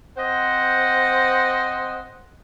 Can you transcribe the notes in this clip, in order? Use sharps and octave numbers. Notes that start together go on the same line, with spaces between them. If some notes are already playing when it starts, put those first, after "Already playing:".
C4 C5 D#5 F#5